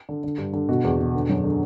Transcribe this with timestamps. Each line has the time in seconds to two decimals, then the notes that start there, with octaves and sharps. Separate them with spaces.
0.09 D3
0.24 D3
0.38 G2
0.53 D3
0.69 B2 F#4
0.84 E2
0.99 B2
1.14 D3
1.29 F#2
1.44 D3